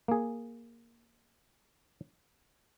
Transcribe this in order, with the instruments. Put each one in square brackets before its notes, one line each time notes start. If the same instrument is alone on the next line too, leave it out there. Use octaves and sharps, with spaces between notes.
[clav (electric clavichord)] A#3 G#4